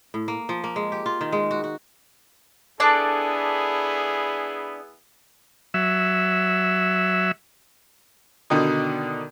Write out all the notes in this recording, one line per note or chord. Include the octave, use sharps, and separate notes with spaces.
A2
A#3
F3
A#3
G#3
G4
F4
D#3
G#3
F#4
F#4
B3 D4 E4 G#4 A4 D5
F#3 E5
B2 D3 D#3 D#4